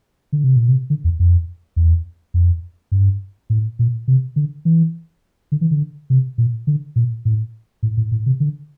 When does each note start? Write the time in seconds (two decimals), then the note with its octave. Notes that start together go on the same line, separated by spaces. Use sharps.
0.33 D3
0.44 C3
0.56 A#2
0.68 C3
0.90 D3
1.04 E2
1.19 F2
1.76 E2
2.34 F2
2.92 G2
3.50 A2
3.79 A#2
4.08 C3
4.36 D3
4.65 E3
5.52 D3
5.61 E3
5.71 D3
6.10 C3
6.38 A#2
6.67 D3
6.96 A#2
7.25 A2
7.83 A2
7.97 A2
8.12 A2
8.26 C3
8.40 D3